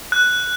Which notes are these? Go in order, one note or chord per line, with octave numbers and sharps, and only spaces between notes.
F#6